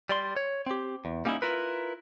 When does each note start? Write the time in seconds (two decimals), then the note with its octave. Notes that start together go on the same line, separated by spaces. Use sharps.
0.09 G3 D5 C6
0.36 C#5
0.66 C4 G4
1.05 E2
1.25 G3 A#3 C#4 D#4 E4
1.42 E4 F4 A#4 B4